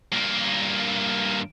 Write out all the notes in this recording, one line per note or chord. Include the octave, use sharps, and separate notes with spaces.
G2 A#3